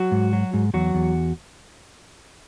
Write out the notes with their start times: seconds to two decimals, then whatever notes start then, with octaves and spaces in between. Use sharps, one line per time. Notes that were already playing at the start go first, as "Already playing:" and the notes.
Already playing: F#3 F#4
0.11 G#2
0.33 F#3
0.54 G#2
0.74 E2 F#3 F#4
0.94 E2